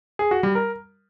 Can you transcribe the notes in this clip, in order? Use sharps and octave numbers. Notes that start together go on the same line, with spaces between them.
G#4
F#4
G3
A#4